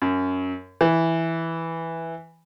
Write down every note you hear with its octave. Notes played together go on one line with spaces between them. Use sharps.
F#2
E3